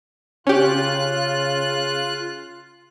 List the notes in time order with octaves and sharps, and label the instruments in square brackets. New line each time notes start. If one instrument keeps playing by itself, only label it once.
[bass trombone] C#3 [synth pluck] C#4 G4 [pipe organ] F4 F#6